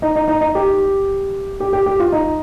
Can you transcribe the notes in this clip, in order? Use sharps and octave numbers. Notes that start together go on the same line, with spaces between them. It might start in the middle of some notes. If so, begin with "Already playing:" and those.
D#4
D#4
D#4
D#4
G4
G4
G4
G4
F4
D#4